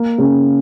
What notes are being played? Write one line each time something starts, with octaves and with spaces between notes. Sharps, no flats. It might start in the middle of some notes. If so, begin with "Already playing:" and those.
Already playing: A#3
C#3